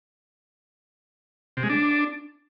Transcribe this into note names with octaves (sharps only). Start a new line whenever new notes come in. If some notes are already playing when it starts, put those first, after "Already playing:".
C3
G#3
D4